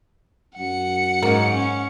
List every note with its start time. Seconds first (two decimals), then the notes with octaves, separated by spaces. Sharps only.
0.58 F#2 F#5 C#7
1.22 G#2 A#3 C#4
1.54 C#4